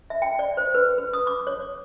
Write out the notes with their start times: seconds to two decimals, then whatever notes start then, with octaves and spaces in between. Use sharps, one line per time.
0.10 E5
0.22 G5
0.39 D5
0.57 C5
0.75 B4
0.98 B4
1.13 D#6
1.27 D6
1.47 C#5